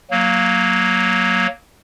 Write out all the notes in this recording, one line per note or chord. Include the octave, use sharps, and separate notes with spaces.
F#3 A#3